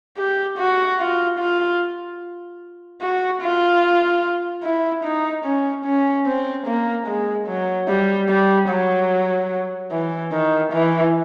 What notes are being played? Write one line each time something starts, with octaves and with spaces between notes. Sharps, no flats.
G4
F#4
F4
F4
F#4
F4
E4
D#4
C#4
C#4
C4
A#3
G#3
F#3
G3
G3
F#3
E3
D#3
E3